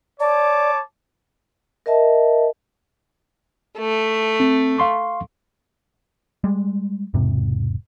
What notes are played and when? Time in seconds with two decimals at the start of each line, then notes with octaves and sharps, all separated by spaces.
0.20 C#5 D5 A5 D6
1.86 A#4 D#5 E5 A5
3.78 A3
4.40 C4
4.78 F5 C6 C#6
6.44 G3 G#3
7.14 E1 G#2 C3